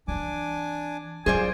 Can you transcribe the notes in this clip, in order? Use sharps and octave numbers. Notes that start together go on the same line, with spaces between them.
E3 C4 D4 G#5 D6
F#3 F4 G#4 C5 D5 G#5